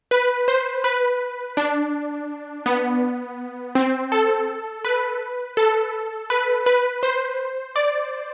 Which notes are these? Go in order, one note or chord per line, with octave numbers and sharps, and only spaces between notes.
B4
C5
B4
D4
B3
C4
A4
B4
A4
B4
B4
C5
D5